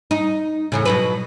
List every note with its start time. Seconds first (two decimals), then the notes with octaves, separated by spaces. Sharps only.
0.11 D#4
0.72 E2 A2 C#3
0.85 B2 F#3 B4